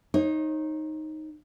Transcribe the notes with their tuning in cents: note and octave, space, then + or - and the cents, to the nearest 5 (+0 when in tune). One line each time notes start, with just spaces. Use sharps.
D#4 +0 C#5 -40